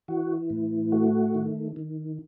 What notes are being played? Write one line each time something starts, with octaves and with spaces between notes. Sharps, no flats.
E3 F#4
A2
A3 F#4
D#3
D#3